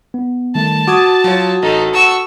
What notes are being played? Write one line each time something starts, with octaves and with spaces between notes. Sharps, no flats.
B3
D#3 G3 A3 A5
F#4 D6 D#6 G#6
F#3 F4 C#5
A1 D#4 A4
F#5 A5 C#6 E6